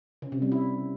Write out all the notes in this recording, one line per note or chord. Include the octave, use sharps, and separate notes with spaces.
C#3
C3
G3
E4